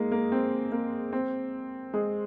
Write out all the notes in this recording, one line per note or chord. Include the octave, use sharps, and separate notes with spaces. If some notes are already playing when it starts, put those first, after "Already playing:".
Already playing: G#3 A#3 D#4
A#3
C4
A#3
C4
G#3